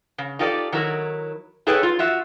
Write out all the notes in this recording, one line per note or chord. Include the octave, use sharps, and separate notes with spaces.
C#3
D#4 F4 G4 A4 C#5 D5
D#3 F#3 E4 A#4
E4 G#4 A4 B4 C#5 G5
F4
F4 F#4 E5